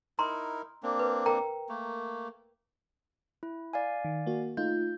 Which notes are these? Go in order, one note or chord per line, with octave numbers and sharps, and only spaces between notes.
D#4 E4 A#4 A#5 C6
A#3 C4 D4
B4
A#4 G5 A#5
A3 A#3
E4
D5 F5 G#5
D#3
A#3 F#4
A3 D#4 F4 G6